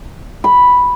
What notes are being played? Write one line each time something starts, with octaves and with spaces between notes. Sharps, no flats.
B5